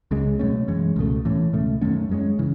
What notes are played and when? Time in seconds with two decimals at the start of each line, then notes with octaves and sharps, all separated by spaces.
0.11 C#2 C#3 G#3
0.39 B2 F#3 A3 C#4
0.68 F#2 E3 G#3 C#4
0.96 C#2 B2 A3
1.25 A2 E3 A3 C#4
1.53 C#2 B2 A3
1.81 F#2 D#3 A3 C#4
2.09 F#2 E3 G#3 C#4
2.39 C#3 E3